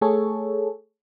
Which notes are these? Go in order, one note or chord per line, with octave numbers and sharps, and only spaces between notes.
A3 G#4 A4 C#5